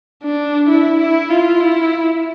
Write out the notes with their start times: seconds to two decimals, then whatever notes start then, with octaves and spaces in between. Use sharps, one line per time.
0.23 D4
0.69 E4
1.00 E4
1.30 F4
1.61 E4